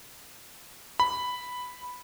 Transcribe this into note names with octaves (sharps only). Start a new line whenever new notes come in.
B5